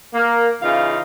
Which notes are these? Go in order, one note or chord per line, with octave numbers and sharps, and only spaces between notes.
A#3
C#3 E3 D#4 F4 F5